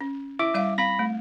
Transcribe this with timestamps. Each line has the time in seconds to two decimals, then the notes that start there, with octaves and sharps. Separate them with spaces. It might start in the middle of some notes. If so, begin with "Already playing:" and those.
0.01 C#4
0.39 E4 E5 D6
0.54 G3 D5 F5
0.78 C4 F5 B5 A#6
0.99 A3